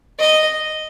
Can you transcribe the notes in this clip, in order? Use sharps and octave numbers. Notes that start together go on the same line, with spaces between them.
D#5